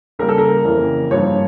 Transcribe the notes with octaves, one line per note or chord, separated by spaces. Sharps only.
C#3 G3 A#3 A#4
A4
A#4
F2 C#3 E3 A#3
G2 F3 A#3 C#5